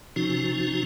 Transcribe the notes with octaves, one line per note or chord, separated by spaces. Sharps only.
C3 F3 C#4 D#4 F#4